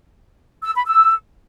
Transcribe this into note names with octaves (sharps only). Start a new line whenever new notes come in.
E6
B5
E6